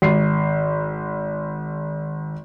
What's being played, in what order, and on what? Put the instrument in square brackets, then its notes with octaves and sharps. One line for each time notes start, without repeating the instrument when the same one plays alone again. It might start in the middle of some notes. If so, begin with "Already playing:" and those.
[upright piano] G#1 C7